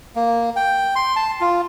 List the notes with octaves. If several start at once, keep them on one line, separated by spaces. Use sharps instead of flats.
A#3
G5
C6
A5
F4